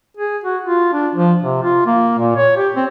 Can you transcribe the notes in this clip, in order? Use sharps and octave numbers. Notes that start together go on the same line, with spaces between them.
G#4
F#4
F4
D4
F3
C3
F4
A#3
A#2
C#5
G4
C4